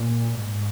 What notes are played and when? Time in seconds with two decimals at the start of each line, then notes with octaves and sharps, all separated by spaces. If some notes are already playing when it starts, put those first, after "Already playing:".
Already playing: A#2
0.38 G#2